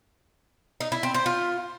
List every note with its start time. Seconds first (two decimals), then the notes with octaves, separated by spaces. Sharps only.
0.81 D#4
0.92 E4
1.03 C4
1.14 C5
1.26 F4